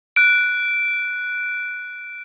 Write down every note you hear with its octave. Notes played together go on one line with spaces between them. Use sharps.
F#6 D7